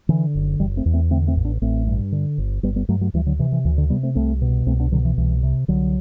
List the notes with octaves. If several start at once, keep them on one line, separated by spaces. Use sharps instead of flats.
D3 E3
F#1
F#1 E3 G3
A3 C4
E2
A3 C4
D3 A3 C4
A3 C4
A1
B3 D4
A1 A3 C4
G2
D3
G1
G1 G3 B3
G3 B3
G2 F#3 A3
F#3 A3
D2 E3 G3
D3 F#3
C3 E3
E3
D2 E3
D3
C3 G3 B3
A3 C4
C2 A3 C4
B2
C2 A3 C4
B3 D4
B2 D3 F#3
E3
C2 E3
C3
C2 D3 F#3